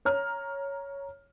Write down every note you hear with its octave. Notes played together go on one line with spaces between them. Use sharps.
C#5 A#5 F6